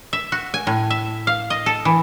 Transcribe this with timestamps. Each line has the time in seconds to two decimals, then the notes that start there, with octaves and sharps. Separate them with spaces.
0.13 E5
0.32 F#4
0.54 G#5
0.67 A2
0.90 E5
1.27 F5
1.50 D#5
1.66 A4
1.85 E3